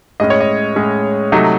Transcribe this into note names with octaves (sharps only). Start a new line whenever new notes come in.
A2 G#3 C#4 D#5
C#5
D#5
A2 G#3 C#4
C3 F#3 A3 D#4